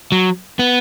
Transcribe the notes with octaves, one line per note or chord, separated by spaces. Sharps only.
F#3
B3